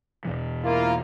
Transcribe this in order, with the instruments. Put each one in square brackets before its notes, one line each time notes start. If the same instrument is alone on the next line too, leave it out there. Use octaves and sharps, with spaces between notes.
[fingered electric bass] E2 B2 E3
[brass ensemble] A#3 E4 F4